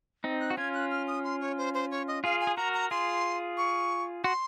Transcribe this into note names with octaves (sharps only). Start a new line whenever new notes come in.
C4 D#4
F#6
F#4
C#4 F4 G#6
F#6
F6
D#6
C6
C#5
C5
C5
C#5
D#5
F4 G#4 F5
G#5
G#4
F#4 A#4 A#5
A#5
F4 G#4 C6
C#6
F#4 C6